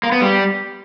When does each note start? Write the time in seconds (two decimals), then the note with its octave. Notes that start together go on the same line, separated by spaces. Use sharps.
0.03 A#3
0.12 B3
0.21 G3